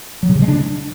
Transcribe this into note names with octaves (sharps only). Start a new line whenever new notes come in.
F#3
C3
C#3
G#3
D4